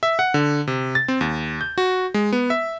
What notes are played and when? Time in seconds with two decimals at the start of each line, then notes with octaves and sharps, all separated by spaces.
0.03 E5
0.19 F#5
0.34 D3
0.67 C3
0.95 A6
1.08 C4
1.21 D#2
1.61 G6
1.78 F#4
2.14 G#3
2.32 B3
2.50 E5